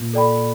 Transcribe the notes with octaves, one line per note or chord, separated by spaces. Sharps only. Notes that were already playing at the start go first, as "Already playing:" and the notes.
Already playing: A#2
A4 D5 G5 B5